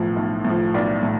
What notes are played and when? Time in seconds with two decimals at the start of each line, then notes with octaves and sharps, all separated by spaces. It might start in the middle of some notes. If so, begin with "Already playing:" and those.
Already playing: B1 A2 F3
0.16 B1
0.45 A2 F3
0.74 B1 D5
1.03 A2